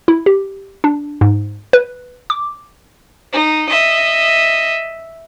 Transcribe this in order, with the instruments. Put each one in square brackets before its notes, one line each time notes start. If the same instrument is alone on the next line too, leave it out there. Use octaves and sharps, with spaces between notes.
[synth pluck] E4
G4
D4
G#2
B4
D6
[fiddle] D#4
D#5 E5